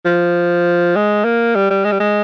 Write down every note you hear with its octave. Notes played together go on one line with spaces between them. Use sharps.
F3
G#3
A#3
G3
G3
G#3
G3
G#3